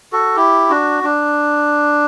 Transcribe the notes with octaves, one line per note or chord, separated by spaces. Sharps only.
F#4 A4
E4 G4
D4 F#4
D4